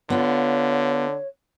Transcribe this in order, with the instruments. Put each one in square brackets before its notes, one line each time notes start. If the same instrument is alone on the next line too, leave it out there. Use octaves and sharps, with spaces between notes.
[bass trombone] D3 [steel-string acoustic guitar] B3 F4 [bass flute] C#5